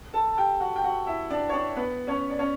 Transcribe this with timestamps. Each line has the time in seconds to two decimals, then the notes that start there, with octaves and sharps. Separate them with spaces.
0.13 A4 A5
0.32 A5
0.37 G4 G5
0.60 F#4 F#5
0.76 G5
0.84 F#4 F#5
1.06 E4 E5
1.30 D4 D5
1.49 C#5
1.53 D4 D5
1.76 B3 B4
2.07 C#4 C#5
2.30 D5
2.39 C#4 C#5